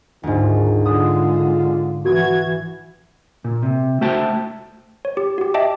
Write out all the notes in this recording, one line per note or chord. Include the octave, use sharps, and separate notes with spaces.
D2 G#2 D#3 F4
D3 G#3 F4 D#6
E3 F#4 G#6
A#2
C3
A3 F#4 C5 E5 G5 A5
C#5
G4
F#4 G4
D#5 E5 G5 A5 D6